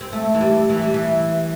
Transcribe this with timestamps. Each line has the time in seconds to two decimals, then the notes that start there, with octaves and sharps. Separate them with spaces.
0.01 C4
0.13 A3
0.34 E3
0.41 G3
0.69 E3
0.82 G3
0.94 E3